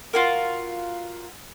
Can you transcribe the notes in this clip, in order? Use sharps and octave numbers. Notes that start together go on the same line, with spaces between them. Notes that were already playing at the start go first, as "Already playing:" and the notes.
F4 F#4 A#4